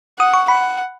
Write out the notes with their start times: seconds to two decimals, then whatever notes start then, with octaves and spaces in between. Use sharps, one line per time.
0.19 F#5 D#6
0.34 C#6
0.48 F#5 B5